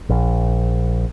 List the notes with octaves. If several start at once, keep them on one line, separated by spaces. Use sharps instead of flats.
A#1